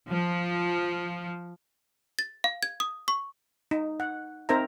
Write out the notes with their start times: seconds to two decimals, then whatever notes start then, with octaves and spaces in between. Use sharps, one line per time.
0.11 F3
2.19 A6
2.44 F5
2.63 G#6
2.80 D#6
3.08 C#6
3.71 D#4
4.00 F#5
4.49 C4 D#4 A#4 C5 E5 A#5